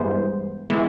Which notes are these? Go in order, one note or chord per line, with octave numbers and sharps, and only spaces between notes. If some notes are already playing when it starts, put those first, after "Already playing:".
Already playing: G2 E3 G#3 B3 C5
E3 G#3 B3